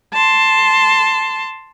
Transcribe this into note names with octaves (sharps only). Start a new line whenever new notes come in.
A5 C6